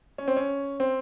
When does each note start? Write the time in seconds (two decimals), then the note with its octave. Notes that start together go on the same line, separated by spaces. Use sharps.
0.18 C#4
0.28 C4
0.36 C#4
0.80 C4